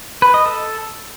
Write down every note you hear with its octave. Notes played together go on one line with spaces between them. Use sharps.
B4
D#5
A4